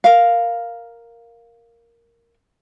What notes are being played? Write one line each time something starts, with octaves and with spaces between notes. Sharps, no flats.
A#4 F5